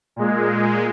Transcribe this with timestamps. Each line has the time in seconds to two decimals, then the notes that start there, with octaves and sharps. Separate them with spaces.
0.16 A#2 G#3